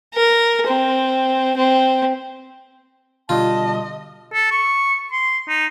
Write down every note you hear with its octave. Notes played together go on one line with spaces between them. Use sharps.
A#4
C4
C4
B2 D3 G3 F4 D#5 A5
A4
C#6
C6
D#4